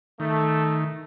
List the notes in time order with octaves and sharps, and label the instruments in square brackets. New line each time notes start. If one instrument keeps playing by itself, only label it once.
[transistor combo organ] D#3 [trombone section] A3